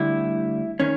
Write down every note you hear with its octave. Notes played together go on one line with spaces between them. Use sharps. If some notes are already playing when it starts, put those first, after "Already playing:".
Already playing: D2 D3 G3 E4
D#3 C#4